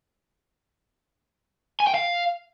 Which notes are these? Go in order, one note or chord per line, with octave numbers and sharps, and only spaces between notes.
G#5
G5
F5